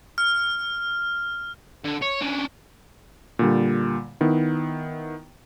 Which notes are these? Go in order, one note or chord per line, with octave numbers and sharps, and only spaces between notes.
F6
D3
C#5
C#4 D4
A#2 D3 G3
D#3 B3 E4